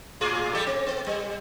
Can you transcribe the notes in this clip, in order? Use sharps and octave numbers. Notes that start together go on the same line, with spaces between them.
A2 F4 G#4
G3 G4 A4
C4
B3
G3